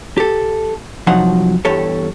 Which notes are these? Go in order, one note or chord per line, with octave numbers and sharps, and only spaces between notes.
G4 A4
C2 F3 F#3 D#4 F#5
E2 G2 G4 A4 C#5